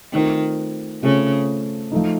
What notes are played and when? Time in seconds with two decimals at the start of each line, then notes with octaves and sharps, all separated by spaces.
0.13 D#3 A3 C4 F4
1.02 C#3 A3 C4 F4
1.92 F3 A3 D#4